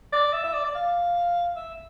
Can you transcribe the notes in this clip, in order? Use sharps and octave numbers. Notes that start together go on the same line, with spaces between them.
D5
E5
E5
D5
D5
F5
E5